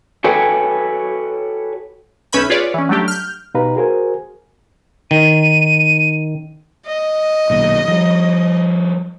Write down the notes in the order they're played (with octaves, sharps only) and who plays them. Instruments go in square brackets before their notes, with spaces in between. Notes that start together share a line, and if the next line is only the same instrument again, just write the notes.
[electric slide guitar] F#4 A4 B4 C#5 G5 G#5
[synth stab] B1 C#4 B4 E5 B5 G6
F4 G#4 B4 C#5 D5
E3 C#4
F#3 G3 A3 D4 G4
F6 G6
[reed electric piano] B2 D#4 G4 B4 F5 A#5
F#4 G#4 A#4 C5 G#5
[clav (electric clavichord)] D#3 [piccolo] D#7
[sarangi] D#5
[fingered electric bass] B1 A#2 D#3
F3 G3